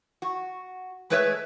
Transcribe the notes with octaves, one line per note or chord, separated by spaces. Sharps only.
F#4
G#3 A3 B4 C#5 D5 E5